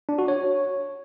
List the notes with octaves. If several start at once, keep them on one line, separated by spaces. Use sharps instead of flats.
D4
F#4
C#5